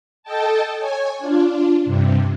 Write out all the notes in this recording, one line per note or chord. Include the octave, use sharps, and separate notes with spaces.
A4 D#5 G5 A5
C#5 G#5
D4 F4
G2 C3